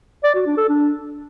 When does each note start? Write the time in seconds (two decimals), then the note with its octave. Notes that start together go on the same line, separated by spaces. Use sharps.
0.24 D5
0.35 F#4
0.46 D4
0.58 A4
0.69 D4